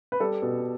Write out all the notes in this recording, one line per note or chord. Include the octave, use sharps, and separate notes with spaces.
B4
G3 A4
B2